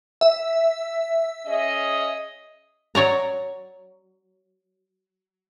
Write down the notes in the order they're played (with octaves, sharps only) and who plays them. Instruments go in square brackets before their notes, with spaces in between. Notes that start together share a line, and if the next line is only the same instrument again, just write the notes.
[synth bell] E5
[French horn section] C#4 G#4 D#5
[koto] F#3 C#5 D5 A#5